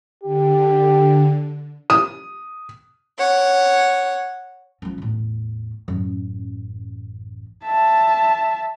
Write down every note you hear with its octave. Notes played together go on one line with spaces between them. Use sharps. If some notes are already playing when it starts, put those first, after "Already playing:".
D3 G4
D#6
C#5 F#5
F3 C#4
E2 A2
A1 F#2
E5 A5